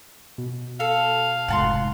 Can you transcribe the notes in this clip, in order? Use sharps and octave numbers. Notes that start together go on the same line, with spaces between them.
B2
A4 F5
F1 G#2 F#5 A5 C6